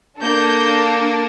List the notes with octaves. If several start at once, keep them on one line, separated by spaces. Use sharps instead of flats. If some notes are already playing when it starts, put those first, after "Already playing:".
A#3 D4 A4 G6